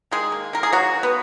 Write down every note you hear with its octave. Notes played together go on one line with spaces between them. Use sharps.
D#3 G#3 G#4
A#3
D#3 A#4
G#4
F#3 A#3 F#4
D#3
B3